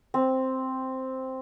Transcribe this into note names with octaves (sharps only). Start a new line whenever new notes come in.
C4